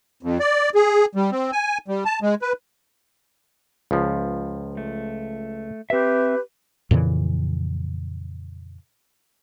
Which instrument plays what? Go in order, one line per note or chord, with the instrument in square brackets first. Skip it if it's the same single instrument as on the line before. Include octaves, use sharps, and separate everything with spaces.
[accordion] F2
D5
G#4
G3
C4
G#5
G3
A5
G#3
B4
[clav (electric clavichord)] C#2 F3
[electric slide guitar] A3
[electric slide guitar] C4 E5 [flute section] G4 B4
[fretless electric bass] F2 A#2 C#3 E3